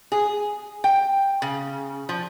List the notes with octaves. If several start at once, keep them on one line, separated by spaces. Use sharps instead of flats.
G#4
G5
C#3
F3